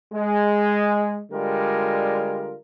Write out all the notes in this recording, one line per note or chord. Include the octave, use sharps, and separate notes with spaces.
G#3
D3 G3 G#3 F4 A#4